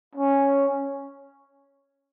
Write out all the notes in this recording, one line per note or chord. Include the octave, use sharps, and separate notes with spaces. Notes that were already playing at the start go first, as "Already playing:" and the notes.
C#4